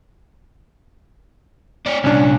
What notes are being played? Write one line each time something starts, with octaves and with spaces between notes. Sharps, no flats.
D4 C#5
C2 A#2 C#4 D4